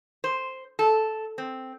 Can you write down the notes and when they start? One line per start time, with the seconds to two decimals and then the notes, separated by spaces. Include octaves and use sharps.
0.24 C5
0.79 A4
1.38 C4